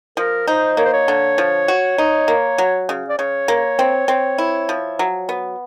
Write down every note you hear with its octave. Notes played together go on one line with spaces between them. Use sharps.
F3 A#4
D#4 C5
A#3 C#5
C5
C#5
D3
F3
F#4
D#4
A#3
F#3
C#3
D5
C#3 C#5
A#3
C4
C4
E4
F3
F#3
B3